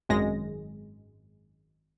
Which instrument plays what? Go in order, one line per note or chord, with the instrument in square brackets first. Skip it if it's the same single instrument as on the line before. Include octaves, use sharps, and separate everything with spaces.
[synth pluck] G#1 F#2 G#3 A#6